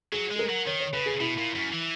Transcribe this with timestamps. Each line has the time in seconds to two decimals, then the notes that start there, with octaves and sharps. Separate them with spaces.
0.12 F#3 G#4
0.31 G#3
0.36 G#4
0.39 A#4
0.49 F#3
0.66 D#3 C#5
0.80 C#5
0.93 C#3 B4
1.06 G#4
1.20 B2 E4
1.38 A#2
1.56 F#2
1.73 E3